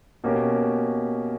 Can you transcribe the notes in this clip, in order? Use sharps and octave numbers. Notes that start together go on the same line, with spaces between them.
B2 A#3 C#4 G4